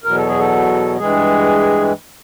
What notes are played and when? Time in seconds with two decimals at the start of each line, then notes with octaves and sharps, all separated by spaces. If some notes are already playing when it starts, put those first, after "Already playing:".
0.04 E2 B2 F#3 A#4
0.16 A4
0.28 G#4
0.39 A4
0.98 G2 E3 G#3 G#4